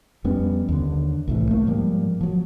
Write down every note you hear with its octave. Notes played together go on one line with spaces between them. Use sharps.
F2 G3 B3 C#4
D#2 D3
C2 A2 E3
A3 A#3
G#2 F3 G3 A#3
F3 F#3